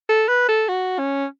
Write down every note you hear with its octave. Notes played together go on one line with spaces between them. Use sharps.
A4
B4
A4
F#4
C#4